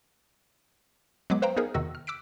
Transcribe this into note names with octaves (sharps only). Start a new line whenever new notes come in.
F#3 G#3 B3 D6
B4 C5 F5 G5 A#5
B3 D#4 G#4 A#4
E2 C3 D#3 F#4 E6
F6
D6 E6 F#6 B6 D7